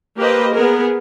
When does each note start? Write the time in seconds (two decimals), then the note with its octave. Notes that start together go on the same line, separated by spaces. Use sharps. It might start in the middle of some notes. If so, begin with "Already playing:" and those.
0.18 A#3 G4 B4 C5 D#5
0.53 B3 G#4 A#4